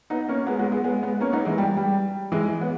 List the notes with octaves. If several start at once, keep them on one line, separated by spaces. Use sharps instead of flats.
B3 D#4
A#3 C#4
G#3 B3
G#3 B3
G#3 B3
G#3 B3
G#3 B3
A#3 C#4
B3 D#4
E3 G#3
G3
G3
E3 G#3
B3